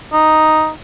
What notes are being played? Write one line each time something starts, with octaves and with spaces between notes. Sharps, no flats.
D#4